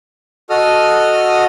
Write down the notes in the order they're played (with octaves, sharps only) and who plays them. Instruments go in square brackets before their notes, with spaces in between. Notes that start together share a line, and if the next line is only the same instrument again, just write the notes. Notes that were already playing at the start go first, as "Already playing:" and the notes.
[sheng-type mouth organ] F#4 A4 D#5 D#6 F6